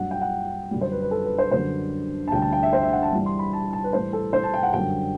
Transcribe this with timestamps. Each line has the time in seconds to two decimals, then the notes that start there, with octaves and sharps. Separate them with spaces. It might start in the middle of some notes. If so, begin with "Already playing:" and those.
Already playing: G2 F#3 F#5
0.11 G5
0.21 F#5
0.71 F#2 D3 G3
0.81 C5
0.92 B4
1.02 B4
1.11 A4
1.25 B4
1.38 C5
1.51 F#2 D3 G3 C5
2.28 A5
2.32 D2 D3 G3 G5
2.42 A5
2.53 G5
2.63 E5
2.73 C5
2.83 E5
2.93 F#5
3.03 A5
3.12 G2 E3 G3
3.26 C6
3.39 B5
3.53 A5
3.73 A5
3.84 B4
3.93 A2 E3 G3 C5
4.13 A4
4.33 C5
4.43 A5
4.54 G5
4.63 F#5
4.73 F#2 D3 G3 G5